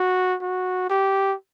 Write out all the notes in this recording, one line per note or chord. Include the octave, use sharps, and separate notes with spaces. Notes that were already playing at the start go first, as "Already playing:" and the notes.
Already playing: F#4
F#4
G4